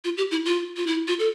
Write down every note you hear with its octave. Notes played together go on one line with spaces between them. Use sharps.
F4
G4
E4
F4
F4
E4
F4
A4